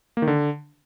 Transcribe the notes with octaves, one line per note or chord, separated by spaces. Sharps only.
A#3
D#3
D3